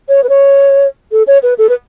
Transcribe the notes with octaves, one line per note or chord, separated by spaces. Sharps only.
C#5
B4
C#5
A4
C#5
B4
A4
B4